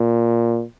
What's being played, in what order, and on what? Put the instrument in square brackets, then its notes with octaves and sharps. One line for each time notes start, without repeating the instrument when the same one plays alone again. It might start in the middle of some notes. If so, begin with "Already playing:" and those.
Already playing: [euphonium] A#2